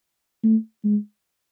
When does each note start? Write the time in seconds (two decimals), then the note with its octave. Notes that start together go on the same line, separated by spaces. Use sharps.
0.44 A3
0.84 G#3